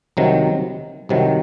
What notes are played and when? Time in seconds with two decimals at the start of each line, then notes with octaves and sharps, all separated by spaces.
0.17 C2 C3 D#3 F#3
1.09 C2 C3 D#3 F#3